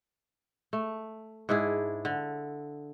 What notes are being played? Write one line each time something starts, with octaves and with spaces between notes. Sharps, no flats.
A3
G#2 D4 E4 G#4
D3